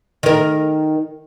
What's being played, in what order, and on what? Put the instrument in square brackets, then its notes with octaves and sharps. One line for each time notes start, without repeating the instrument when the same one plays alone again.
[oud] D#3 A#4